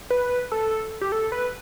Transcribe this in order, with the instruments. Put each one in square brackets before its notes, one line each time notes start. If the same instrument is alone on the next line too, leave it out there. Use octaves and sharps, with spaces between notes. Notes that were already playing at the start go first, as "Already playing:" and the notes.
[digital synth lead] B4
A4
G4
A4
B4